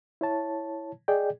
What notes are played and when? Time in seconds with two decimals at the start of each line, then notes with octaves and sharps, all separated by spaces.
0.21 E4 C#5 A5
1.08 G#4 D5 D#5 G5